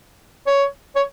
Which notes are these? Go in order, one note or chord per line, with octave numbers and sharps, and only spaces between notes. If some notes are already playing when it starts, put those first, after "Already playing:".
C#5
C#5